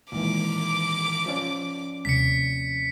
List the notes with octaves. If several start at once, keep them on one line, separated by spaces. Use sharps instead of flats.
A#2 D#3 E3 G#3 D6
F3 C#4 D5
D#2 C3 B6 C#7